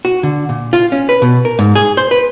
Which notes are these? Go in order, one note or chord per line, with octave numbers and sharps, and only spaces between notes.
F#4
D3
A#2
F4
C#4
B4
B2
A#4
G#2
G#4
C5
B4